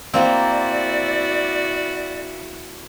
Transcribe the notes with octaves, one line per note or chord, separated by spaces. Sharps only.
A#3 C4 E4 F#4 D5